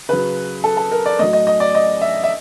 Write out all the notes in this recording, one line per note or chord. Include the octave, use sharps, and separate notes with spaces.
C#3 F#3 B4
A4
A4
A#4
D5
A2 F#3 D#5
D#5
D#5
D5
D#5
E5
E5